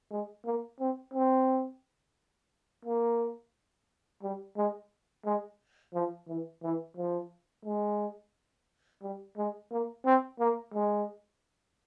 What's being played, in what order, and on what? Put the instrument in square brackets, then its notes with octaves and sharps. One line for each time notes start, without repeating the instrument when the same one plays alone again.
[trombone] G#3
A#3
C4
C4
A#3
G3
G#3
G#3
F3
E3
E3
F3
G#3
G3
G#3
A#3
C4
A#3
G#3